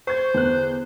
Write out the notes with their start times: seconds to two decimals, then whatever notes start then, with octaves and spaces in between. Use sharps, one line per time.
0.07 C5 C#6 G#6
0.34 E2 D3 F#6